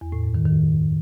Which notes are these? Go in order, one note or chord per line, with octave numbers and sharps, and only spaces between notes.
E2
A2
F#2
D#3
D#3